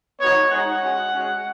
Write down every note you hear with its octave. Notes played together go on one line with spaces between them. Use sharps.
B3 D#4 F#4 C#5
G#3 D#4 F#4 F#5
G#3 C#4 F#4
G#3 C#4 F#4